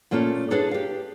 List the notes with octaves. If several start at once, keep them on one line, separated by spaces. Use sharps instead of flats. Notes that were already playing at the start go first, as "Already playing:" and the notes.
A#2 A3 A#3 C#4 F4 A4
D4 E4 G#4 A4 B4 C#5
G4 F5